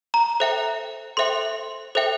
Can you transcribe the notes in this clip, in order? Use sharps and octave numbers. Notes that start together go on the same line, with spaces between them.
A#5
A4 C5 E5 G5
A4 C5 E5 G5 C6
A4 C5 E5 G5